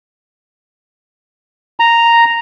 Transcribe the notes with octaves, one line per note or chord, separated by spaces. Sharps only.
A#5